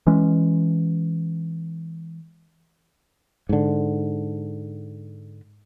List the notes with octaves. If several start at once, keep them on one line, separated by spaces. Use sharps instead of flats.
E3 G#3 C#4
G#2 D3